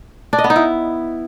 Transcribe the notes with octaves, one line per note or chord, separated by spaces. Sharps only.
D4
D#5
B3
D#4
E4